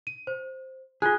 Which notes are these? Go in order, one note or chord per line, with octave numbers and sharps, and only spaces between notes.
D#7
C5
F4 G#4 F#6